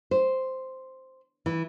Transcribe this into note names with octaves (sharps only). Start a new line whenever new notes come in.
C5
E3